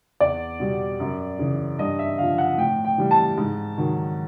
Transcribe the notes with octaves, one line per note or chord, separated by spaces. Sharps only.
E2 D5
B2 G3
F#2
C#3 E3
G2 D#5
E5
D3 F3 F5
F#5
A2 G5
G5
E3 G3
A5
G#2
D#3 F#3